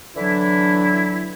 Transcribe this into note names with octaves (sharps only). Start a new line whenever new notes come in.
D3 E3 F#3 D4 E4